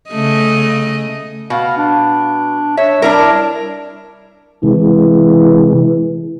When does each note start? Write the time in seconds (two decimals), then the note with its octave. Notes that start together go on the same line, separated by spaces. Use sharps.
0.11 C#3 A3 D#5
1.50 B2 F5
1.77 D4
2.77 C#5 E5
3.02 G3 D4 E4 A#4
4.63 C3 E3 G#3